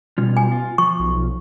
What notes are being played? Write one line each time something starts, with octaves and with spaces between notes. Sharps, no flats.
B2 G3 C#4 F4
G#5
F4
F3 C#6
B1